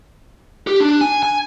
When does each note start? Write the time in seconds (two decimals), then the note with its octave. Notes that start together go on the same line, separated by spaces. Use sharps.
0.67 G4
0.80 D4
1.01 G#5
1.23 G#5